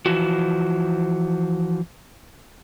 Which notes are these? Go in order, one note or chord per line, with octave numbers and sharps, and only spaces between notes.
E3 F3 F#4